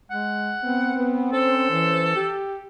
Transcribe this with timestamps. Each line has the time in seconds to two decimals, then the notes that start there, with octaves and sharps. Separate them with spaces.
0.11 G#3 F#5
0.64 B3 C4
0.96 B3
1.33 C#4 A4 C5
1.71 E3
2.16 G4